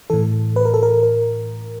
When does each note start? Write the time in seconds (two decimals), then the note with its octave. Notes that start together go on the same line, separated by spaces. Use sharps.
0.10 A2 E3 A4
0.56 B4
0.65 A#4
0.74 A4
0.83 A#4
1.03 A#4